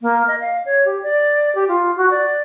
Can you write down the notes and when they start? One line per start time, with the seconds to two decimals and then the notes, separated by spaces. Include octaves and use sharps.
0.01 A#3
0.28 D#5
0.41 F5
0.66 C#5
0.85 G4
1.03 D5
1.55 G4
1.68 F4
1.97 F#4
2.11 D5